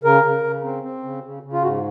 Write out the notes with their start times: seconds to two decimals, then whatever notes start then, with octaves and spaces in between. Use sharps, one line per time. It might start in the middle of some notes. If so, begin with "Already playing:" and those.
0.04 C#3 A#4
0.25 C#3
0.44 C#3
0.64 C4
0.83 C4
1.03 C#3
1.24 C#3
1.43 C#3
1.53 F4
1.63 G#2 F#4